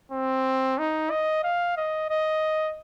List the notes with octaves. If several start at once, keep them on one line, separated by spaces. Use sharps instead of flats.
C4
D#4
D#5
F5
D#5
D#5